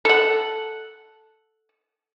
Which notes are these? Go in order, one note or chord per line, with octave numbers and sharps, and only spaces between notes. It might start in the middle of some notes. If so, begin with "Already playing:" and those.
A4 F#5